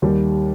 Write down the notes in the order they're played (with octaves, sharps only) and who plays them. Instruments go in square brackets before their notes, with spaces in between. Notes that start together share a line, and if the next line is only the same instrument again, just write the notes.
[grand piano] D#2 G3 G4